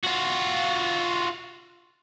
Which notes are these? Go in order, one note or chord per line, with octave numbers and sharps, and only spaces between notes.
F4 F#4